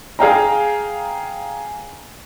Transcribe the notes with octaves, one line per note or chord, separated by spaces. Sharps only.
G#4 F5 G5 A#5